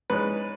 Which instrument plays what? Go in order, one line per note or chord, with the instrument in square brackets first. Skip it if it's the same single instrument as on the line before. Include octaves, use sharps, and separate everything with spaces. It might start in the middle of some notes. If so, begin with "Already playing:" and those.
[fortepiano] G#2 G#3 C#4 B4